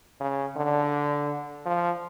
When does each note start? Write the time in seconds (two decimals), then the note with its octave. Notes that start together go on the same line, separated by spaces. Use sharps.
0.20 C#3
0.56 D3
1.65 F3